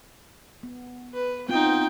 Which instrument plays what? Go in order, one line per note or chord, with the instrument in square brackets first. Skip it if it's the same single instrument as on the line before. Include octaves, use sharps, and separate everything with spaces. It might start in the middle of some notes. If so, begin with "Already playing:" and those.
[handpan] B3
[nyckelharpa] B4
[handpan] B3 C4 F4 [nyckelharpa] D#4 G5